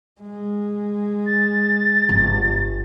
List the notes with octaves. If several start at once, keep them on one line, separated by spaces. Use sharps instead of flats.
G#3
A6
G1